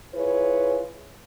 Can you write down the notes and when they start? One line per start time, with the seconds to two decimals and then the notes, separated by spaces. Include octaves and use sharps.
0.14 E4 F4 G#4 B4 C#5